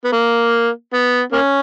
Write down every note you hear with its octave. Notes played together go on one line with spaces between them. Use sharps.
B3
A#3
B3
A#3 C#4